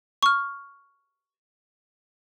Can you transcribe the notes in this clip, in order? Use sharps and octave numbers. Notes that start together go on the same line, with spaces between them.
C#6 F6